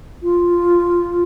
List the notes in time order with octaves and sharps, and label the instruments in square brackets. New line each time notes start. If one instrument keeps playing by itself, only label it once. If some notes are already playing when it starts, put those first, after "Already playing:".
[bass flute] F4